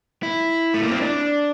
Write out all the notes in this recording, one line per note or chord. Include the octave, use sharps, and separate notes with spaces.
E4
A3
A#3
C4
D4